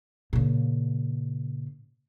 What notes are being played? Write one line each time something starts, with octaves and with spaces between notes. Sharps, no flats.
A#2 C#3